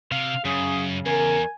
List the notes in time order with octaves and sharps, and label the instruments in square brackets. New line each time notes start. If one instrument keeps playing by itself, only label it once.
[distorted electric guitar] C3 [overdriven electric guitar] F5
[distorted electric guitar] F#2 [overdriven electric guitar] C#3 [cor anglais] G#4
[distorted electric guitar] E2 [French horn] A#4 [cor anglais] G#5